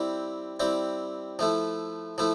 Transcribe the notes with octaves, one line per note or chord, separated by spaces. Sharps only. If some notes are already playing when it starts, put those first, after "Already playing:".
Already playing: G3 C4 E4
G3 C4 E4
F3 A3 E4
F3 A3 E4